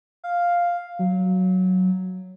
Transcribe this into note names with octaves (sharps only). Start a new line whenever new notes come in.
F5
F#3